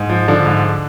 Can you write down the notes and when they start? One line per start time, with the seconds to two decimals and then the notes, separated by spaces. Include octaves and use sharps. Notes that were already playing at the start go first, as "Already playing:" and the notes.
Already playing: G#2
0.10 F3
0.28 D3 F3 D4
0.46 G#2